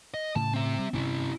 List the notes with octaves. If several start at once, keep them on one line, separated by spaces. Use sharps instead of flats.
D#5
A2 C#3 A5
C4 E5
G3
G2 C3 C#4 E4